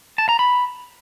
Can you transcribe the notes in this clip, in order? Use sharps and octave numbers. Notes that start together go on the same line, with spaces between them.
A5
A#5
B5